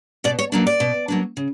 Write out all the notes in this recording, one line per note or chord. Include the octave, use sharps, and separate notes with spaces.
B2 D5
C#5
F#3 A#3 D4
D5
B2
F#3 A#3 D4
C#3